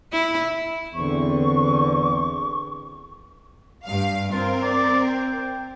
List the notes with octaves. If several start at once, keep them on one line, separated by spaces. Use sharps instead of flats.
E4
E2 D3 C4 C#6
G2 F5
C4 F4 A#4
D5
G5